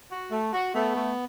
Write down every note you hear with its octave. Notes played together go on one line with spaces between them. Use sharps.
F#4
A3
F#4
A3 B3
A3